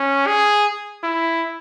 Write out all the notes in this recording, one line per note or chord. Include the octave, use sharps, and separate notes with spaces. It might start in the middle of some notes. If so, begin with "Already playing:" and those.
Already playing: C#4
G#4
E4